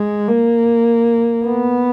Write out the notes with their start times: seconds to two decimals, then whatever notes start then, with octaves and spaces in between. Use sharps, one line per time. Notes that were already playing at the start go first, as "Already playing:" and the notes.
Already playing: G#3
0.28 A#3
1.45 B3